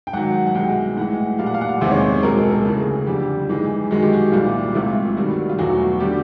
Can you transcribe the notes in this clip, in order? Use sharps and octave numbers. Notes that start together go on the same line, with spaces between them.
G5
G#2 D#3 F#3 F#5
F#5
C2 B2 G#3 G5
A2 E3 G#3 F#5
A#2 G3 F5
F#5
F5
F#5
F5
E2 C3 D#3 G#3 C5
C#5
C5
C#2 B2 G#3 A#4
A4
A#4
D2 C#3 E3 G#4
F2 D3 G3 G4
G#2 E3 G#3
F#2 D#3 G#3 F#4
G4
F#4
C2 A#2 G3 F4
C#2 C3 E3 A3 F4
G2 D#3 G3 F#4
F4
E2 B2 F#3 A3 F#4
D3 G3 G4